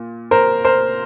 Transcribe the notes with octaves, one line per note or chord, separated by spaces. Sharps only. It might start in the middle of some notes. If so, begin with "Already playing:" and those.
Already playing: A#2
A#4 C5
A#4 C5